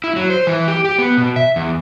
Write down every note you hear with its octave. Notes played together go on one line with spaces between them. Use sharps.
E4
F#3
C5
E3
G4
G4
B3
B2
E5
E2